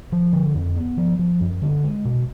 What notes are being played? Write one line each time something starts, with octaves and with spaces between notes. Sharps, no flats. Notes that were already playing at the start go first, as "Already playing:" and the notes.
F3
D3
F2
B3
F3
F3
F#2
D3
G#3
B2